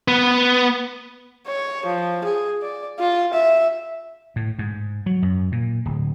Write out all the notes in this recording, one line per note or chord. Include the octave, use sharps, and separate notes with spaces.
B3
C#5
F3
G#4
D5
F4
E5
A2
G#2
F#3
F#2
A#2
D1